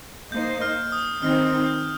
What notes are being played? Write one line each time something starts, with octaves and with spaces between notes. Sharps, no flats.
A#3 D#4 C5 D#5 G6
F6
D#6
D#3 C4 D#4 F6
G6